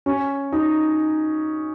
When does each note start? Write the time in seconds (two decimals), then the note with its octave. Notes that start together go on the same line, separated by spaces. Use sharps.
0.06 C#4
0.52 D#4